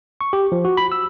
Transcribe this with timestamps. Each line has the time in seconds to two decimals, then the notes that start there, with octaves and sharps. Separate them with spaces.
0.21 C#6
0.33 G4
0.52 F3
0.65 F#4
0.77 B5
0.92 E6